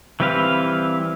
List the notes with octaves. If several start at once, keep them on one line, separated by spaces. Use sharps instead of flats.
E3 G3 C4 B4 F5